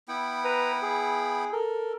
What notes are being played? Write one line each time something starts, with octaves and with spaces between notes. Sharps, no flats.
B3 E4 G5
B4 A#5
G#4
A4 A#4